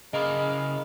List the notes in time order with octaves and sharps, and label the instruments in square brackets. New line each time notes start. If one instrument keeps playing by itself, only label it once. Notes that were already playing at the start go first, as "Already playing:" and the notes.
[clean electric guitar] C#3 A#4 F5 [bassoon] G#3 [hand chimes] D#5 B5